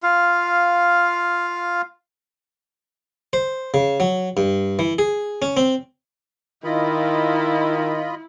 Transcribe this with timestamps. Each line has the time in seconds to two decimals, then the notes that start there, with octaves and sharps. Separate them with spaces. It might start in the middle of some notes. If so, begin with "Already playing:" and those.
0.03 F4 F5
3.33 C5
3.74 C#3
4.00 F#3
4.37 G2
4.79 E3
4.99 G#4
5.42 C#4
5.57 C4
6.64 D#3 E4 F4 D#5 B5